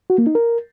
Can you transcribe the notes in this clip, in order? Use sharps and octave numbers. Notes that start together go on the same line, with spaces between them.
F#4
A#3
D#4
A#4